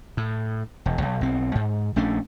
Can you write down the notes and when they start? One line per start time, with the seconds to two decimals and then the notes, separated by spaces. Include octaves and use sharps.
0.17 A2
0.86 E1
1.02 B1
1.21 B1 C4
1.55 G#2
1.96 A#1 A3 C#4 D4